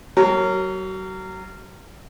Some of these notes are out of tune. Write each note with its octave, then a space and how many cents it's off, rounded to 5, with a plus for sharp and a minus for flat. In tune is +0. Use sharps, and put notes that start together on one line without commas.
F#3 +35 A#4 -20 C#5 -15